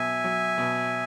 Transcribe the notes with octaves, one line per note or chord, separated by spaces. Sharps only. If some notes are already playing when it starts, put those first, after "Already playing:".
Already playing: B2 F#3 E5 G#5
F#3
B2